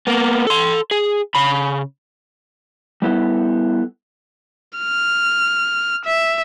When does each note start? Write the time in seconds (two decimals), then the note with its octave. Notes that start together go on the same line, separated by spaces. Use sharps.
0.07 A#3 B3
0.47 A4 C6
0.91 G#4
1.35 C#3 B5
3.02 G3 B3 E4 A4
4.79 F6
6.05 E5